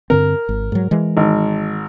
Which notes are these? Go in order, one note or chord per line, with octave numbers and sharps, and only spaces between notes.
G2 D3 C4 A#4
G#1
G#2 F#3
E3 G#3
G#1